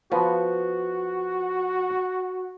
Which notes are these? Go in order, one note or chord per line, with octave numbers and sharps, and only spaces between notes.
F3 B3 F#4